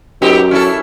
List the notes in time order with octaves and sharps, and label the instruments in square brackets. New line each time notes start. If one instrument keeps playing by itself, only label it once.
[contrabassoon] F#2 [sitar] B3 D#4 G4
[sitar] C#4 E4 A4